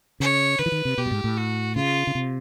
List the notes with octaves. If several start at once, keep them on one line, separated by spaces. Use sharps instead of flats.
C#3 C#5
D3 B4
E3
D#3
C3
B2 G4
G2
G#2
A2
F#4
C#3 F4
C#3
C3